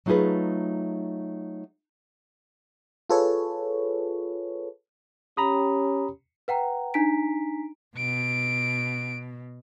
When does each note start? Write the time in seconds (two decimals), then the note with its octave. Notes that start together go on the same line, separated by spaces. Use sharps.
0.06 F#3 A3 D#4 F4 G#4 B4
3.10 F4 G#4 A4 B4 C#5
5.37 C#4 G4 A#5 B5 D#6
6.48 B4 F#5 G5 A#5
6.94 D4 D#4 G#5 A#5 B6 D7
7.97 B2 D7